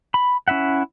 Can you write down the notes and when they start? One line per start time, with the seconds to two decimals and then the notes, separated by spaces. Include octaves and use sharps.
0.14 B5
0.48 C#4 E4 E5 F#5